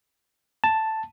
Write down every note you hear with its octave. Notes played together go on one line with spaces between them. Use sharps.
A5